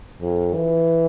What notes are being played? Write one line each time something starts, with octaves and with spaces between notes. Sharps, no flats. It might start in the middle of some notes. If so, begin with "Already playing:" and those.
F2
E3